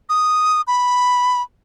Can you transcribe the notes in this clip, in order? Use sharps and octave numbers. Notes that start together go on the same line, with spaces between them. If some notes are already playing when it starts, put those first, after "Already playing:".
D#6
B5